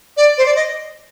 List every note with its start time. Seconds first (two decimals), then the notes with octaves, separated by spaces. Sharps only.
0.17 D5
0.38 C5
0.46 D5
0.56 D#5